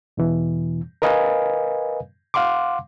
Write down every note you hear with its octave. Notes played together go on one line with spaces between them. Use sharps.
E2 B2 E3
A#4 B4 D#5 F5 G#5
F5 F#5 C6 D6